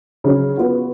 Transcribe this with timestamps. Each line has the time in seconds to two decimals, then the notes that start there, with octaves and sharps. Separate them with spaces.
0.24 C#3 F#3 C#4
0.57 B3 F4 F#4